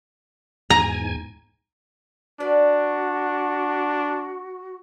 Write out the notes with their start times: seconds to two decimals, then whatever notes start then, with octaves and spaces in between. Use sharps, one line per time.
0.70 E2 G#2 G#5 A#5
2.40 D4 F#4 B4 D5 F5